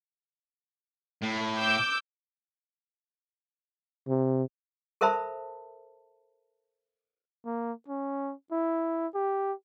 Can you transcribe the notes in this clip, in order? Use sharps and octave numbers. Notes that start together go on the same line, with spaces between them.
A2
D6 E6 G6
C3
A4 A#4 C5 E5 A5 B5
A#3
C#4
E4
G4